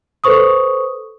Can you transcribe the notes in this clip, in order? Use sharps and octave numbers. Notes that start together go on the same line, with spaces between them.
A4 B4 C5 C#6 D#6